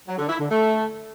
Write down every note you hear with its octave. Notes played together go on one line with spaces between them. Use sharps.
F#3
D3
E4
D3
A3